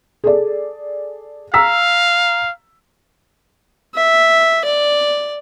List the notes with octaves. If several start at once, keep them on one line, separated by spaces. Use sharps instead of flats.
G#4 A4 D5
F5 A#5 E6 B6
E5
D5